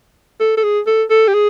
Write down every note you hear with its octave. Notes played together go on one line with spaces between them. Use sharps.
A4
A4
G#4
A4
A4
G4
G#4